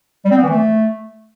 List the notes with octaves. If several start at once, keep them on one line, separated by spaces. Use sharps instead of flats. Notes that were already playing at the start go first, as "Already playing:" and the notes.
G3
C4
B3
E3
A3